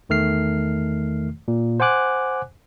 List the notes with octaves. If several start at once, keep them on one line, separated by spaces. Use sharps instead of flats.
E2 D#3 A3 F6 C7
A#2
C5 F#5 G#5 D6 F#6